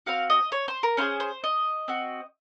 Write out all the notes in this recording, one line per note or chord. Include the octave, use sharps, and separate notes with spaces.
C4 F#4 F5
D#5
C#5
C5
A#4
C#4 F4 G#4 C5
C5
D#5
C4 F#4